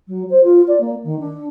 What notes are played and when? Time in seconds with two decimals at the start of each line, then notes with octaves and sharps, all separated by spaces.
0.07 F#3
0.29 C5
0.43 F4
0.67 D5
0.80 A#3
1.03 D#3
1.19 D4